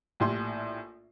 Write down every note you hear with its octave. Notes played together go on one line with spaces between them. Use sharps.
A#1 A2 G4 C6